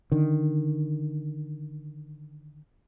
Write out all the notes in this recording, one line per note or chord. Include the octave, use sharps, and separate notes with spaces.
D3 D#3